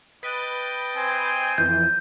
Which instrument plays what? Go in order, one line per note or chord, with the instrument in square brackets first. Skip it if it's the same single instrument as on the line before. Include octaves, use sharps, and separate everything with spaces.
[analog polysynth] B4 A6 [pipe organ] D#5 G5
[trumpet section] C4 C5 G#5
[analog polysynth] F2 E3 [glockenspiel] G6